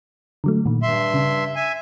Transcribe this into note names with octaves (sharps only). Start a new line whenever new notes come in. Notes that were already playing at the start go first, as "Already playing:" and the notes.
D3 F#3 A3
A#2 D#3
G2 E5 C6
C#3
E5 G#5